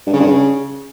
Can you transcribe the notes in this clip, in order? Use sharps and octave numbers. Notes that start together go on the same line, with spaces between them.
G2
C#3
G2
C#3